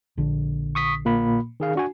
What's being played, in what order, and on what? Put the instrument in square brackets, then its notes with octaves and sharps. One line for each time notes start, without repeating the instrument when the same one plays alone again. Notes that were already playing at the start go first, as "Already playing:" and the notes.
[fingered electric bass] A#1 D3
[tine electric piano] C#6 D#6 B6
A#2 A#3 B5
D#3 G#4 F5
D4 F#4 G#5